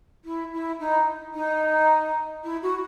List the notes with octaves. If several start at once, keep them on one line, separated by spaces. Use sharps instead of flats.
E4
E4
D#4
D#4
E4
F#4